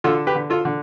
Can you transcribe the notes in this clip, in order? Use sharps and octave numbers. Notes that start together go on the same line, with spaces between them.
D3 F4 A4
G4 B4
D3
F4 A4
D3